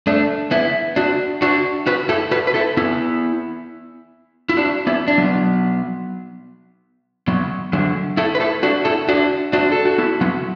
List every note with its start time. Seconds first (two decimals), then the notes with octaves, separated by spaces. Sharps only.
0.07 A3 D4
0.51 B3 E4
0.96 D4 F#4
1.42 D4 F#4
1.87 F#4 B4
2.09 E4 A4
2.31 F#4 B4
2.47 B4
2.54 E4 A4
2.77 B3 E4
4.49 E4
4.57 D4 F#4
4.87 B3 E4
5.08 D4
5.18 F#3 B3
7.28 F#3 B3
7.73 D3 F#3
8.17 E4 A4
8.35 B4
8.40 E4 A4
8.63 D4 F#4
8.85 E4 A4
9.09 D4 F#4
9.53 D4 F#4
9.72 A4
9.85 F#4
9.98 B3 E4
10.21 F#3 B3